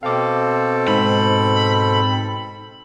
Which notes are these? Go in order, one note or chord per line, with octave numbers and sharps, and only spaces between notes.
B2 C4 A4 F5 D6
G#2 B5